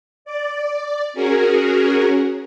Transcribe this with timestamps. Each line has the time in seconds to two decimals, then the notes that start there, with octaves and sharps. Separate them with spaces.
0.25 D5
1.13 C#4 F#4 G#4 A#4